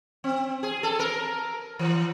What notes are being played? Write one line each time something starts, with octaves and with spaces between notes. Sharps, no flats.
C4
G#4
A4
A#4
E3